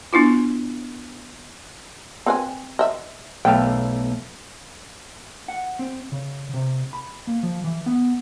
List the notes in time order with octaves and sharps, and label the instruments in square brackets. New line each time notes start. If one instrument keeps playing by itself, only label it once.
[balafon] B3 D4 E4 F4
[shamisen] C4 B4 G#5
D#5 E5
[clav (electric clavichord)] B1 A3 F5 [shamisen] G5
[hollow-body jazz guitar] F#5
C4
C#3
C3
B5
A#3
F3
E3
B3